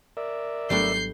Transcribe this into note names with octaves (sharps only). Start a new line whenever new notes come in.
A#4 D5 E5
G#1 F#3 G3 A3 B3 D4 G6 C7